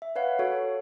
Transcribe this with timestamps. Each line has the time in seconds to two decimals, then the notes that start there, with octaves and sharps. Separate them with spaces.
0.02 E5
0.16 B4 C#5 F5 F#5
0.39 F#4 A4 C#5